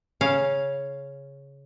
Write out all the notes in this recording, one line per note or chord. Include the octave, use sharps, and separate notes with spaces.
C#3 C#4 F5